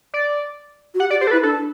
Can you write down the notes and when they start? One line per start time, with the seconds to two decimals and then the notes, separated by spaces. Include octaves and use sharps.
0.14 D5
0.94 F#4
1.00 G4 F#5
1.10 G4 D5
1.21 G4 C5
1.27 A4
1.31 E4 B4
1.43 D4 A4